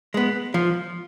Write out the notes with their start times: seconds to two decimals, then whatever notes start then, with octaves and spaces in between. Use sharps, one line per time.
0.14 G#3 B3
0.54 F3